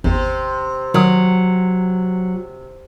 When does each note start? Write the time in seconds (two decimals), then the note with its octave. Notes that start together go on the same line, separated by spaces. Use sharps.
0.04 G#1 E2 C3
0.94 D#3 F#3 D#6